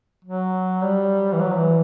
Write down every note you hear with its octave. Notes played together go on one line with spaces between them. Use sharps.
F#3
G3
E3
F#3
E3